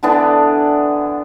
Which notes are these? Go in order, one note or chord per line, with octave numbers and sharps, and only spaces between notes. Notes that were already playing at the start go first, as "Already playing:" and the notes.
D3 E3 B3 D4